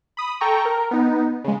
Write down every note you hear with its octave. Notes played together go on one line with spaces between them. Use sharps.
B5 D#6
A4 G5 A#5 C#6
A#4
B3 D#4
C#3 G#3